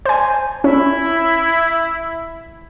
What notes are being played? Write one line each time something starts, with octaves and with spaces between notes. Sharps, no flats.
C5 G#5
C#4 E4